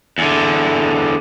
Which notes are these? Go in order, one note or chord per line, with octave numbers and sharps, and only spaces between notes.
E2 D3